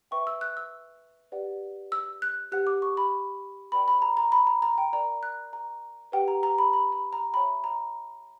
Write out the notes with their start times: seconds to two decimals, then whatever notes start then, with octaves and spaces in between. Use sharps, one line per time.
0.11 B4 E5 G5 C#6
0.27 E6
0.41 F#6
0.57 E6
1.32 G4 B4 D5 F#5
1.92 E6
2.22 F#6
2.52 G4 B4 F#5 F#6
2.67 D6
2.82 C#6
2.97 B5
3.72 B4 D5 G5 B5
3.88 B5
4.02 A#5
4.17 A#5
4.32 B5
4.47 A#5
4.62 A#5
4.78 G5
4.93 A#4 D5 G5 A#5
5.23 F#6
5.53 A#5
6.12 G4 B4 F#5 G5
6.28 A#5
6.43 A#5
6.58 B5
6.73 B5
6.92 B5
7.13 A#5
7.33 C#5 E5 G5 B5
7.64 A#5